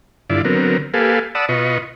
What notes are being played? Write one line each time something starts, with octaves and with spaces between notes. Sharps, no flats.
G2 D3 E4 F4 D5
D3 F#3 B3 C4 A#4
A#3 G4 A4 B4 F5 G#5
D5 F#5 A5 B5 D#6 E6
B2 F4 B4 D#5 C#6